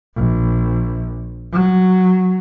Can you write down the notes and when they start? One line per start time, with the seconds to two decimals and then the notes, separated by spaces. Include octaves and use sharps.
0.16 A#1
1.52 F#3